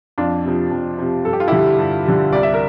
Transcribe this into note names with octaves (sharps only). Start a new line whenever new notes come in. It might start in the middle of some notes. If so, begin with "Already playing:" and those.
F2 D4 F4
C3 F3
F2
C3 F3
G2 A4
G4
F4
D3 G3 E4 G4
G2
D3 G3
C2 D5
E5
A#4 D5